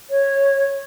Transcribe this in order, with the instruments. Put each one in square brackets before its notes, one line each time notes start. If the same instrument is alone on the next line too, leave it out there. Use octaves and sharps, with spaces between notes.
[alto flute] C#5